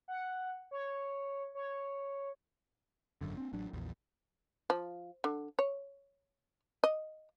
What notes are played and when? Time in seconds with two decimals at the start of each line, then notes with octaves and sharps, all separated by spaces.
0.08 F#5
0.71 C#5
1.55 C#5
3.21 G#1 F#2 D3
3.37 C4 D4
3.53 A1 F#3 D4
3.73 A#1 E2
4.70 F3
5.24 D3
5.59 C#5
6.84 D#5